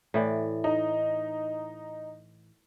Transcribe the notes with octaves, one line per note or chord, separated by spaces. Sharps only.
A2 E3 D5
D#4